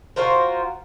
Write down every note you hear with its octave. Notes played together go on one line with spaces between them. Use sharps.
F4 F#4 A#4 C5